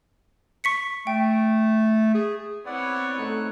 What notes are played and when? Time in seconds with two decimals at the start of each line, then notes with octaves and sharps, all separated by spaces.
0.64 C#6 B6 C#7
1.07 A3 G5
2.14 G#4
2.66 B3 C4 E4 C#5 D5 F#5
3.18 G#2 A3 D#4 F#6